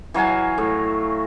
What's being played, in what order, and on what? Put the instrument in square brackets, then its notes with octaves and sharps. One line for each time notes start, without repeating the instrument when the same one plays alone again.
[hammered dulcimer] E3 F#3 F5 G#5
A2